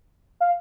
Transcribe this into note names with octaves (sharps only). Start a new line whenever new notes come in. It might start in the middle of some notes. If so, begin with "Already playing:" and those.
F5